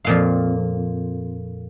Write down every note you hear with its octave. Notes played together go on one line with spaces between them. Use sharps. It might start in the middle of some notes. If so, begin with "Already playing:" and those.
F2 A#2 F5